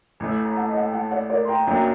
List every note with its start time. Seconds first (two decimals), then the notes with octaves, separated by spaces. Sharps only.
0.20 A1 A2 A3
0.45 A#5
0.57 F#5 A5
0.68 D#5
0.77 F#5
0.85 G5
0.93 F#5 A5
1.11 D5 F#5
1.30 A#4 D5
1.45 C6
1.48 G5 A#5
1.67 F#2 F#3 A#3 D4 G5 A#5